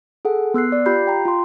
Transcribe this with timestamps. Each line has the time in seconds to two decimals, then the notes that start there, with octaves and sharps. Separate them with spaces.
0.25 G#4 A4 F#5
0.54 B3 E6 F#6 C7
0.72 D5
0.86 F4 G4 B5 G6 C7
1.07 G5 A#5
1.25 F4 C6